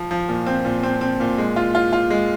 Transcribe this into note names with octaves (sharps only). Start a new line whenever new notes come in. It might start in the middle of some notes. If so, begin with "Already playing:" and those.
Already playing: F3
F3
A#2
C4
A#2
C4
C4
A#2
G#3
F4
F4
F4
G#3